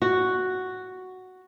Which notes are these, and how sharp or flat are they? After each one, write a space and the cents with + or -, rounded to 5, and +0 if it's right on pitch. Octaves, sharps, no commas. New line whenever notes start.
F#4 +0